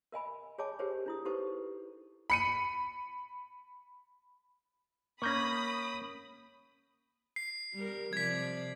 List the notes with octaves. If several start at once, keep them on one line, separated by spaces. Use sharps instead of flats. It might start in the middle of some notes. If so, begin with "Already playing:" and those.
A#4 D#5 G#5 B5
G#4 C#5 D#5 G#5 A5 D6
G4 G#4 A#4 C5 C#5
D4 E4 D#6
D#4 G4 A4 B4 C5 C#6
B5 C#7 D#7
A#3 C#4 B5 C#6 D#6 G6 A#6
C7
G3 A#4
C3 F3 D5 G#6 B6